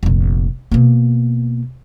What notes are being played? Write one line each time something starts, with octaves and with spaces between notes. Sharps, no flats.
F1 A#1
B2 A#3